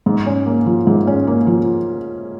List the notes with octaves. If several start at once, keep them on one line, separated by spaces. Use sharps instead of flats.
G#2
C#4
A#3
F3
G#2
C#4
A#3
F3